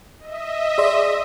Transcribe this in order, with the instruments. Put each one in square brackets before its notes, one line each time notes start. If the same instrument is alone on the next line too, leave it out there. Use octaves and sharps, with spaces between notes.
[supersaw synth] D#5 E5
[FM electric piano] G#4 D5 C6